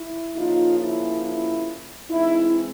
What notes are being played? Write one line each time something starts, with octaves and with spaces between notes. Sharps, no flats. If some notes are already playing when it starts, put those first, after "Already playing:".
Already playing: E4
C#3 F3 A#3 C#4 D#4 F4
E4
E4
E3 G#3 C4 D#4 E4